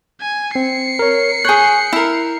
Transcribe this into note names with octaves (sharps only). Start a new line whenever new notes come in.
G#5
C4 C7 C#7
A#4 C#5
G#4 C#5 F#6 G6
E4 A#4